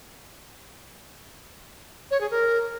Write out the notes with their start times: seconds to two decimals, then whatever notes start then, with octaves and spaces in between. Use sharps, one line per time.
2.11 C#5
2.21 G#4
2.31 A#4